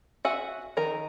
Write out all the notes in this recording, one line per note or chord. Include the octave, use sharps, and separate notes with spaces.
F#4 E5 F#5 G#5
D#3 D#4 A#4 A#5